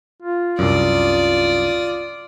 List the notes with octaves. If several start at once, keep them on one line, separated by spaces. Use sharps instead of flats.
F4
C2 F#2 D5 D#6